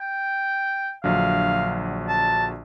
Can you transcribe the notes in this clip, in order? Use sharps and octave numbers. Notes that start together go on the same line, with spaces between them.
G5
A#1 D3 F#3 F5
A5